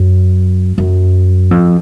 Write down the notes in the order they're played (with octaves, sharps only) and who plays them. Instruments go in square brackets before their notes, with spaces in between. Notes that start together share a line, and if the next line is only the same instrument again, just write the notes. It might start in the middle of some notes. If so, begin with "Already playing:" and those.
Already playing: [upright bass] F#2
F#2
F2